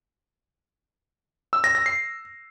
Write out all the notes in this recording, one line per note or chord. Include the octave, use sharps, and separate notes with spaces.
E6
A#6
A#6
C7